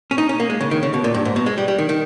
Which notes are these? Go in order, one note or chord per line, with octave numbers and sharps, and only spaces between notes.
C#4
D#4
C#4
A#3
G#3
C#3
D#3
C#3
B2
A#2
G2
G#2
B2
G#3
G3
G3
D#3
D#3